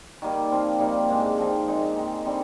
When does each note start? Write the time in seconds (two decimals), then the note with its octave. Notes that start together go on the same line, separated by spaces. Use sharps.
0.22 D#3 G3 A#3
0.51 F3 C4 F4
0.79 A#2 G3 A#3 D#4
1.08 G#2 D#3 G#3 D4
1.38 F3 C4 D#4
1.67 A#2 G#3 C4 D#4
1.96 D#3 G#3 D#4
2.25 D3 G3 C4 D#4